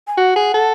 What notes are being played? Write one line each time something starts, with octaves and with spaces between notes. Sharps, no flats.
G#5
F#4 F#5
G#4
A4